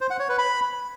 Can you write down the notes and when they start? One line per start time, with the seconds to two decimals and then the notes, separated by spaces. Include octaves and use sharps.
0.01 C5
0.10 F#5
0.20 C#5
0.29 B4
0.38 B5